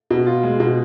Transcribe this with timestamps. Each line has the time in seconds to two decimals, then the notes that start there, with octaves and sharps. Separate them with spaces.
0.11 B2
0.27 F4
0.43 G#3
0.60 B2